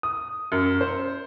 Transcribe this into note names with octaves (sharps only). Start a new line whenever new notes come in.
D#6
F#2
C5